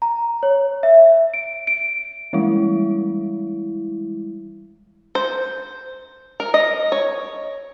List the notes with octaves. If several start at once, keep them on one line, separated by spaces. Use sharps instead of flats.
A#5
C#5
E5
D7
D7
E3 G3 G#3 E4
C5
A#4
D#5
C#5